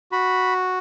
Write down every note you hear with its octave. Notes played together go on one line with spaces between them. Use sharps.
F#4 B5